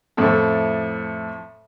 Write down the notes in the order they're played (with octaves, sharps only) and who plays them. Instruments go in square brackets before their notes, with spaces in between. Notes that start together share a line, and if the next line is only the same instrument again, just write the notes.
[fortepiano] F2 A2 E4 A4